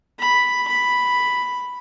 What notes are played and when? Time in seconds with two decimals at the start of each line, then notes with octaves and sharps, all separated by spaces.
0.19 B5
0.67 B5